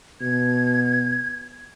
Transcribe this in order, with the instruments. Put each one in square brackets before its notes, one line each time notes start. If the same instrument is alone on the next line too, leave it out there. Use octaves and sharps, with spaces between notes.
[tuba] B2 [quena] G#6